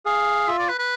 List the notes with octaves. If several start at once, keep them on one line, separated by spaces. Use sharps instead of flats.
G#4 F5
F4 E5
D5
B4
B4